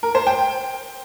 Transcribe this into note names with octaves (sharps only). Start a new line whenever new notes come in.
A#4
C5
G5